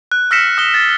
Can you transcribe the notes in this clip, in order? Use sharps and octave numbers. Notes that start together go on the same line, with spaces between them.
F#6
E6 F6 A#6 B6 C#7 E7
D#6 F#6 G7
A6